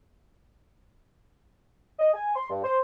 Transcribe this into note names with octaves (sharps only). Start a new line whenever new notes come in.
D#5
G#5
C6
G2
C5